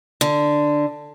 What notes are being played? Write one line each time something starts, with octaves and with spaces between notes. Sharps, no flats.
D3